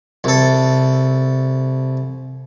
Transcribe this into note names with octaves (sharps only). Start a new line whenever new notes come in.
C2 A4